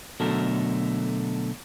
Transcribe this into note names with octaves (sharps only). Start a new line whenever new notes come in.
B2 D3 F#3 A3 A4 A#4